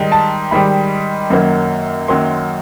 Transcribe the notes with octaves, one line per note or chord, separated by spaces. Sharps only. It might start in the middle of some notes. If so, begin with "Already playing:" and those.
Already playing: G#2 D#3 G3
A5
G#2 D#3 G3 B5
F#2 D#3 F#3 A#3
F#2 D#3 F#3 A#3 C6